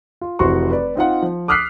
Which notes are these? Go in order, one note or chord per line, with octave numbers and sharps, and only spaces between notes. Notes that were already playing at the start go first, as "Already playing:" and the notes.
F4
F1 E3 F#4 C5 C6 C#6
B4 D5
C4 D#4 F4 F#5
F3
D6 D#6 F6 F#6 B6 C7